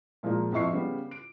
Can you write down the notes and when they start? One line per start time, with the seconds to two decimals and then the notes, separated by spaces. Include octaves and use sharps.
0.23 A#2 F3 G#3 A#3
0.52 F2 F3 E5 C#6 C7
0.72 C#3 G3 B3
1.11 D7